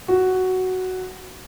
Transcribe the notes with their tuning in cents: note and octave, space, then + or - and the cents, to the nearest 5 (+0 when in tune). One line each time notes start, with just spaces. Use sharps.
F#4 +5